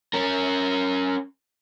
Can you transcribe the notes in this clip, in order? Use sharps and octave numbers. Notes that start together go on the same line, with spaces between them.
C#4 A#4